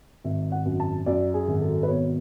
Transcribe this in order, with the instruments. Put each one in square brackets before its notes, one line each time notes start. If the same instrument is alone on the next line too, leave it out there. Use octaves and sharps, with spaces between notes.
[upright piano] G#1 E5
F#5
F#2
A5
F#2 D5
G#4
G#1
A4
B4
B2 C#5